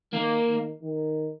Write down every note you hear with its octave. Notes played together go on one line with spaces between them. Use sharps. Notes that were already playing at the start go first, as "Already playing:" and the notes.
D#3 A#3
D#3
D#3